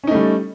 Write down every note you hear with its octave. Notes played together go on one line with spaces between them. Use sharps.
G3 A3 C#4 D#4